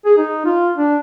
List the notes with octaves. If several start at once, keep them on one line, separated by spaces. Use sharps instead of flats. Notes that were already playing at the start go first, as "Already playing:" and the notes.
G#4
D#4
F4
D4